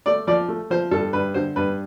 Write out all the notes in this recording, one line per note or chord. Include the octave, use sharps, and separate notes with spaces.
A3 D5
F3 D5
A3
F3 C5
G2 A4
G2 B4
D3 C5
G2 B4